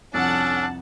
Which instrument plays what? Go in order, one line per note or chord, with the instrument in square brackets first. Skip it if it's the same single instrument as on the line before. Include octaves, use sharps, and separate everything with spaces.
[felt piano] C2 F2 [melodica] C#4 A4 [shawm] D4 [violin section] F#5 A5